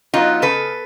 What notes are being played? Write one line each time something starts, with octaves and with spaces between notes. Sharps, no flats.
F#3 B3 D#4 F4
C#3 A4 B4